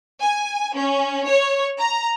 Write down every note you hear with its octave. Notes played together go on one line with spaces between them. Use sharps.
G#5
C#4
C#5
A#5